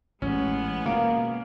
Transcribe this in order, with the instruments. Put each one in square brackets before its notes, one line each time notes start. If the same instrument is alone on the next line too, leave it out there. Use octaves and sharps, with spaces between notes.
[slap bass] A1 [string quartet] G#3 B3 [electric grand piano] C#4
[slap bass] B2 [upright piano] A#3